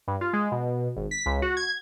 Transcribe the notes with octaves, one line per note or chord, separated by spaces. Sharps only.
G2
F4
G#3
B2
G#1
B6
C#2
F#4
G#6